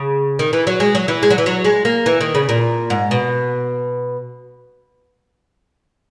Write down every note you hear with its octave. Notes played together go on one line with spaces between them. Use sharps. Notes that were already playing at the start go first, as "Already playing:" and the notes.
Already playing: C#3
D#3
E3
F#3
G#3
F#3
E3
G#3
F#3
E3
F#3
G#3
A#3
E3
D#3
C#3
A#2
G#2
B2